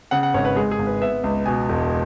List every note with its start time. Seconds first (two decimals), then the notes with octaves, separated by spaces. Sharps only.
0.11 C#3 F#5
0.23 F#5
0.34 G#1 C#5
0.45 B4
0.56 G#3 G#4
0.71 G#4
0.79 G#1
0.86 B4
1.01 B3 E5
1.24 C#2
1.46 B2 G#5
1.69 E1